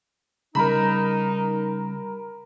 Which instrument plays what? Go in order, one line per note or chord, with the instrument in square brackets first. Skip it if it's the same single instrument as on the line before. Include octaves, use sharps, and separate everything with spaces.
[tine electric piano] C#3 G3 [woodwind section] D#4 [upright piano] A#4 B5 [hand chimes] A#5